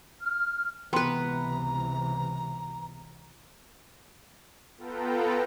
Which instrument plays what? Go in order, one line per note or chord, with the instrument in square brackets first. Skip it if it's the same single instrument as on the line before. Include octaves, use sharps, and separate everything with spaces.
[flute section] F6
[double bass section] C#2 C3 E3 [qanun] B3 B4 [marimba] G5 C6 [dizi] A#5
[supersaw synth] B3 F4 A4 B4 G5 A#5